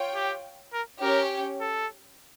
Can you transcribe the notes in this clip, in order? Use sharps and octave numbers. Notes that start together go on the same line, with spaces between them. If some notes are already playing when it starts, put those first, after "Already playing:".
Already playing: F4 C#5 G5
G4
A#4
C#4 G4 A#4 C#5 G5
A4